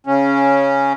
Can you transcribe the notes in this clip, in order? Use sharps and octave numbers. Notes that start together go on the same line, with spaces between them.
C#3 C#4